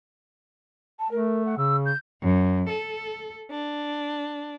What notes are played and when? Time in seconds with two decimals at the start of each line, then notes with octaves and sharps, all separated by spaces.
0.99 A5
1.11 A3 A#4
1.45 F#5
1.57 C#3 E6
1.85 G6
2.21 F#2
2.69 A4
3.50 D4